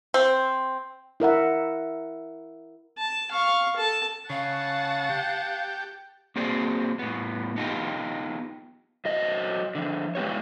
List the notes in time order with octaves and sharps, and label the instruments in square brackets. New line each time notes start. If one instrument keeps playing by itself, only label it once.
[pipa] C4
[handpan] E4 A#4 E5 F#5
[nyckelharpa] A5
F5 C#6
A4 A5
[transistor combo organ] C#3 [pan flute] F5 [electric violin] F#5 A5
[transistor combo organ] G4
[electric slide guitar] A#3 C4 F#4 G#4 C5 D5
A2 B3
B3 D#4 F4 G4
F#3 C5 D#5
D3 F3
G#3 B3 G4 C#5